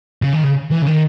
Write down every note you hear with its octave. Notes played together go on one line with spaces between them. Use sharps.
C#3
D#3
C#3
E3
C#3
D#3